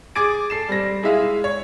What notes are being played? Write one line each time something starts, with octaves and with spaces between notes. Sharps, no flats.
G#4 D6 G#6 A6 D7
A4 C7 E7
G3 C4 A#6
G#3 E4 G#4 E5 F5
C#5